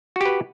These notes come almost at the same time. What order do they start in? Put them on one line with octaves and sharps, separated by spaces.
F#4 G4 B4